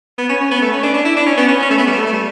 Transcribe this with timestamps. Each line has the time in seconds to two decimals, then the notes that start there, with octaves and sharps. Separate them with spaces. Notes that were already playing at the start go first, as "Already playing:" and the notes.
0.18 B3
0.29 C#4
0.40 C#4
0.51 B3
0.62 A3
0.72 C#4
0.83 D4
0.94 D4
1.05 E4
1.16 D4
1.26 C#4
1.37 B3
1.48 C#4
1.62 C#4
1.70 A3
1.78 B3
1.87 G3
1.92 A3
2.06 A3
2.13 G3